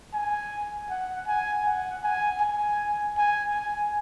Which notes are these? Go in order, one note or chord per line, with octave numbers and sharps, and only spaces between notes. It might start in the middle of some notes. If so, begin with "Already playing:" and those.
G#5
F#5
G#5
F#5
G#5
G#5
G#5
G#5